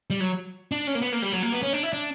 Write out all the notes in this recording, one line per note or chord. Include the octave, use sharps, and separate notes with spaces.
G3
F#3
D4
C#4
A#3
B3
A#3
G3
F#3
A#3
B3
C#4
D4
E4
D4